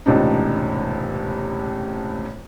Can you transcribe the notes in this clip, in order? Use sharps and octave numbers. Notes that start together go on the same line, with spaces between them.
E1 C#2 A2 C3 D4 D#4